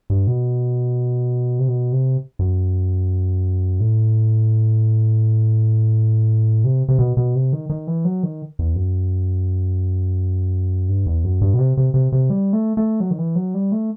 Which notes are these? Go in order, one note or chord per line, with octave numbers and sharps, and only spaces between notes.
G2
B2
C3
B2
C3
F#2
A2
C3
C3
B2
B2
C3
D#3
D#3
E3
F#3
D#3
E2
F#2
G2
E2
F#2
G2
B2
C3
C3
C3
C3
G3
A3
A3
F#3
D#3
E3
F#3
G3
A3